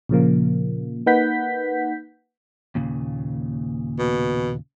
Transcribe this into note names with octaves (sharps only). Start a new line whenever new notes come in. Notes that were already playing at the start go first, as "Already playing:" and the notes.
A#2 C#3 F3 A#3
A#3 D#4 B4 F#5 G6 B6
D#2 A#2 C#3
B2